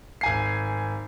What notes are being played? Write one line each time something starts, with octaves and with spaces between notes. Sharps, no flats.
G#1 G#5 C7